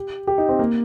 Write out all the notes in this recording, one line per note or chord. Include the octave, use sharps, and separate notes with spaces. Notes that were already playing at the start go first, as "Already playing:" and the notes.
Already playing: G4
G4
D#4
C4
A#3